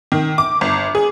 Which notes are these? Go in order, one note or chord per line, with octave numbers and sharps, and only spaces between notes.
D#3
D6
G1
G#4